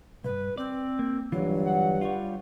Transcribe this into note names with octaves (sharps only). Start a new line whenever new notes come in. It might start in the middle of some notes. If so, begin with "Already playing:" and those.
B1 G2 B4
C4 D5
A#3
G2 D3 E3 F#3 F4
F#5
G3 F4 C#5